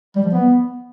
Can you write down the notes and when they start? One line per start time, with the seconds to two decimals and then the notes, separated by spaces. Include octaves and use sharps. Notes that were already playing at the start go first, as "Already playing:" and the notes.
0.16 G3
0.24 F3
0.33 B3